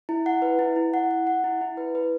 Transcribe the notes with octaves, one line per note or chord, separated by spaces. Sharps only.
E4
F#5
B4
E4
E4
F#5
F#5
F#5
E4
E4
B4
B4